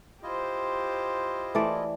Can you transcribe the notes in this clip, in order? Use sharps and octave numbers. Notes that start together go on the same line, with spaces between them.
E4 F4 G4 C5 D#5
E3 A3 D5